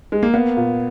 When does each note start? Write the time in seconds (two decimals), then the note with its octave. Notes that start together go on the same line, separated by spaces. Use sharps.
0.12 G#3
0.23 A#3
0.34 A#3 B3
0.57 A#2